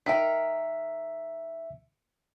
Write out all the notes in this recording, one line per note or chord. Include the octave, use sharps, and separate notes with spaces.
D#3 A#4 E5 B6